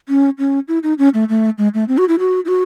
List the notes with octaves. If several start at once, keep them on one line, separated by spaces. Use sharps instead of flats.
C#4
C#4
E4
D#4
C#4
A3
A3
G#3
A3
C4
F#4
E4
F#4
E4
F#4